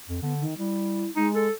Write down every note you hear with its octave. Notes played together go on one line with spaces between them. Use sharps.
F2
D3 B3
D#3
G3 E4
G#3 D#4
A4